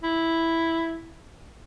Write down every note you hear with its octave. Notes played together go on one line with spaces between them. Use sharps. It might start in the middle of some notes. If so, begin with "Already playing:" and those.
E4